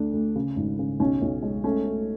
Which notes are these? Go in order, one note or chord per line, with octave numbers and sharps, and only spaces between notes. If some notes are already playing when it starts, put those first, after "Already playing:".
Already playing: D2 A3 D4
D2
C#3
G#1
C#3
B1 C#4
B1
G#3
A3 C#4
A3